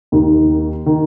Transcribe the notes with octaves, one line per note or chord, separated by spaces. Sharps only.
D#2 D#3
D#3